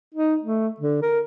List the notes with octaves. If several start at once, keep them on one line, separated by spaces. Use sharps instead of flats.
D#4
A3
D3
A#4